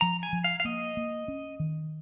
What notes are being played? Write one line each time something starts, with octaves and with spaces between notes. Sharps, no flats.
F3 A#5
G#5
F3
F5
F5
A#3 D#5
A#3
C#4
D#3